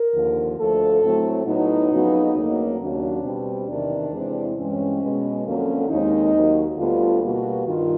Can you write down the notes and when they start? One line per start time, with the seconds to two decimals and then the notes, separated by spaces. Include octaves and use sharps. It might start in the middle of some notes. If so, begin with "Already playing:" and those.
Already playing: A#4
0.13 D#2 D3 F3
0.57 D2 D3 F3 A3 A4
1.02 A2 F#3 A3 C4
1.45 A2 F#3 B3 D#4
1.90 F2 C#3 F#3 B3
2.34 D2 C#3 F#3 A#3
2.78 D#2 C#3 F#3 D4
3.23 B2 G3 C4
3.68 E2 C3 D#3 D4
4.12 E2 C3 E3 G#3 C4
4.56 G2 E3 G#3 C4 C#4
5.01 B2 G#3 B3
5.45 F2 D3 F#3 A#3 C#4
5.89 D#2 D#3 G#3 C4 D#4
6.32 D#2 D#3 F#3
6.77 D2 D3 G3 B3 F4
7.21 B2 G3 A#3 F#4
7.66 G2 D#3 F4